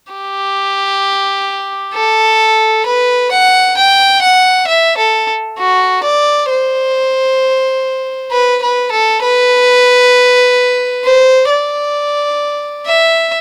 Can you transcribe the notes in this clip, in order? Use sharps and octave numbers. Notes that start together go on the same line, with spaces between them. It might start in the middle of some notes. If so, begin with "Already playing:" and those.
G4
A4
B4
F#5
G5
F#5
E5
A4
F#4
D5
C5
B4
B4
A4
B4
C5
D5
E5